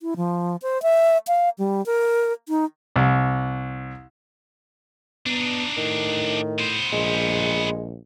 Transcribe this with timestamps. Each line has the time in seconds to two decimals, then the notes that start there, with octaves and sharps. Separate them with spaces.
0.01 E4
0.17 F3
0.62 C5
0.82 E5
1.27 F5
1.58 G3
1.86 A#4
2.49 D#4
2.96 C2
5.26 B3 D4 D#4
5.77 A2 D#3
6.59 B3 C5
6.92 A#1 G#3